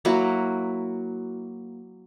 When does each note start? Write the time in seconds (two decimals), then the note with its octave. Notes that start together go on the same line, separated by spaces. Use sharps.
0.05 F#3 A#3 E4 F#4